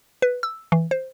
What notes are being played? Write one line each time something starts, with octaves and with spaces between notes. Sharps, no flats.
B4
E6
E3
C5